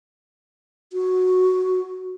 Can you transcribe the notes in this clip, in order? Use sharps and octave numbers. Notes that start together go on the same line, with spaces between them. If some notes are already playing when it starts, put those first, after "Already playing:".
F#4